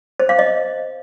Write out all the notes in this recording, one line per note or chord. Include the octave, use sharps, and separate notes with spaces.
C5
F5
D#5